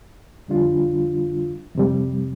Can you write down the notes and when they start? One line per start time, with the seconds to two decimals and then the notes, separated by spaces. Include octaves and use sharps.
0.48 F2 D3 G3 D4 F4
1.76 F2 C3 G3